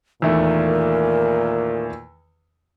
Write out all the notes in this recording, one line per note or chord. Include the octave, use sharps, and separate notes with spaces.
E2 A#2 D#3 A3 A#4